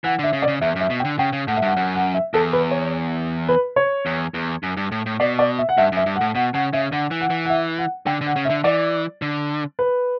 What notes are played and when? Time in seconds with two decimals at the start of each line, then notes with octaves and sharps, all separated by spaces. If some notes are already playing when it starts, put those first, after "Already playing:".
0.04 E3 F#5
0.19 D3 E5
0.33 C#3
0.42 D5
0.48 C#3
0.61 E2 E5
0.76 F#2
0.81 E5
0.90 B2
1.00 G5
1.05 D3
1.19 C#3 G5
1.33 C#3
1.47 A2 F#5
1.57 E5
1.62 G2 F#5
1.76 F#2 F#5
1.95 F#5
2.14 E5
2.34 E2 A4
2.53 B4
2.71 C#5
3.49 B4
3.76 C#5
4.06 E2
4.34 E2
4.63 F#2
4.77 G2
4.92 A2
5.06 A2
5.20 B2 D5
5.39 D5
5.59 E5
5.69 F#5
5.78 G2 E5
5.92 F#2 E5
6.06 G2
6.16 F#5
6.21 A2
6.35 B2 F#5
6.54 C#3 F#5
6.73 C#3 E5
6.92 D3 F#5
7.11 E3
7.21 F#5
7.30 E3
7.45 F#5
7.50 E5
7.78 F#5
8.07 D3 G5
8.21 D3
8.26 F#5
8.36 C#3
8.45 E5
8.50 D3
8.64 E3 D5
9.22 D3
9.79 B4